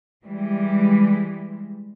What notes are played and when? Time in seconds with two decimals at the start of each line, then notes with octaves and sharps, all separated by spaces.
0.24 E3 G3 G#3